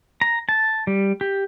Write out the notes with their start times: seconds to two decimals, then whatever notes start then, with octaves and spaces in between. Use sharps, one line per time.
0.21 A#5
0.49 A5
0.87 G3
1.21 G4